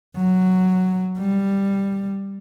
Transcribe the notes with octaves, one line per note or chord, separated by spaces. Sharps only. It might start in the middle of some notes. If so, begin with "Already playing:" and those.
F#3
G3